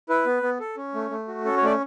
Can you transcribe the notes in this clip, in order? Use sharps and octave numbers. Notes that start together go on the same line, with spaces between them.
E4 B4
B3
B3
A4
C#4
A3
A3
F#4
C#4 A4
C#5
A3 D5